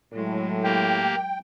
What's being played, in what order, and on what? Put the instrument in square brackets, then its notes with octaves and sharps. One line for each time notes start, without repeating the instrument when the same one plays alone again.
[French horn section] A2 [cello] F#3 G#3
[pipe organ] A#3 G4 [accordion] G5